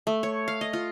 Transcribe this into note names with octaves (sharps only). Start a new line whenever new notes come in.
A3
C#5
F5
D#5
F4